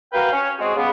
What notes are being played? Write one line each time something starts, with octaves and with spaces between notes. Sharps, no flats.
F#4 A#4 B4 F5 G5
C#4
G#3 C4 F#4 G#4
C#3 G3 B3